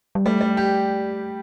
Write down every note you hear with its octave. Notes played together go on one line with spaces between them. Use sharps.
G3
G3 A3
G3
G4